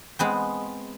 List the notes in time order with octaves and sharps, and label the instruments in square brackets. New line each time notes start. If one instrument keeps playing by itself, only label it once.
[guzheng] G#3 B3 C4